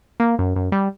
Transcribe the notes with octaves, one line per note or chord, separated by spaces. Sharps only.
A#3
F#2
F#2
G3